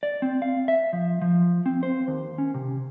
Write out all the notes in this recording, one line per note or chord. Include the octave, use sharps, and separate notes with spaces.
D5
C4
F5
E5
F3
F3
C4
C5
D#2
C#4
C3